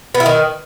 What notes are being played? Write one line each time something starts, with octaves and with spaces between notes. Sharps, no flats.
B3
E4
D#3